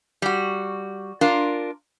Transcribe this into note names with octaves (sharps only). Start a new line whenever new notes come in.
G3 F#4
D4 F4 A#4